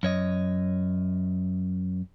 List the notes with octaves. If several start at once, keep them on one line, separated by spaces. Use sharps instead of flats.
F#2 C#5 D#5